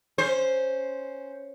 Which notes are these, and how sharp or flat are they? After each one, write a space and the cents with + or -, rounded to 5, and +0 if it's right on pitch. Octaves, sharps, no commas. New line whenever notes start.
C#4 +0 C5 +0